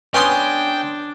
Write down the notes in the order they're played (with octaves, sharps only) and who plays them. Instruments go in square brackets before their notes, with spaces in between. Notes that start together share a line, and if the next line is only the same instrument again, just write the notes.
[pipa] G3 B3 C#4 [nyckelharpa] D4 [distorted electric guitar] G5 [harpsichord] G#5 C6 D#6